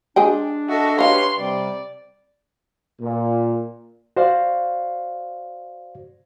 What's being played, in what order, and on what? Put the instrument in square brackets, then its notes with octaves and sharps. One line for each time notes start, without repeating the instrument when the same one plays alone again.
[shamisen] G#3 G#4 G5 [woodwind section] D4
[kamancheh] F#4 A4 [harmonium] D#5 E5
[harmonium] G4 B4 C#5 [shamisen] D#5 F5 [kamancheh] C6
[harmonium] C3 G3 [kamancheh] D5
[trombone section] A#2
[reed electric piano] F#4 C5 D5 F5